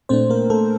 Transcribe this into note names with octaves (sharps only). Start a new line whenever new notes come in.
A#2 A3 C4 D4 C5
A#3 A#4
A3 A4